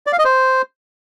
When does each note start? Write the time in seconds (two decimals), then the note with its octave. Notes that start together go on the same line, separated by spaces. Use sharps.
0.07 D5
0.13 F5
0.19 D#5
0.25 C5